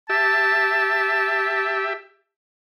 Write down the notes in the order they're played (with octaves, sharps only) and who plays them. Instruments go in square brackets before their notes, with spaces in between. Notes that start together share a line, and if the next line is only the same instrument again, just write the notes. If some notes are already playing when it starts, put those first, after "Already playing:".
[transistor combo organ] G4 E5 [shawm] A5